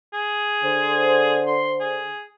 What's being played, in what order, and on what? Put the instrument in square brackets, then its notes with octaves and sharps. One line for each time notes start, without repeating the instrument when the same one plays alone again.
[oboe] G#4
[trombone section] D3 C5
[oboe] C6
G#4